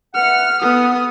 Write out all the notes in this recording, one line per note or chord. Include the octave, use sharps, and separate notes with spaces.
B4 E5 F#5 F6
B3 A4 B4 F#5 D#6